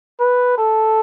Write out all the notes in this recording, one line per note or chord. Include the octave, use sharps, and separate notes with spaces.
B4
A4